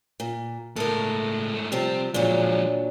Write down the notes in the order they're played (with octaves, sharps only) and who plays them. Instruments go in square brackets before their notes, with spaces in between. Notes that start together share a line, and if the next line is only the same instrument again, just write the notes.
[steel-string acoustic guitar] A#2
[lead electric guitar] C#2 A2 [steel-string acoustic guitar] A4 A#4
[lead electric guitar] G#2 A3
[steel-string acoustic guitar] C3 F3 G3 [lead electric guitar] C4
[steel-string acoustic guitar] A#2 F#3 D4 [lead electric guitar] F3 G#3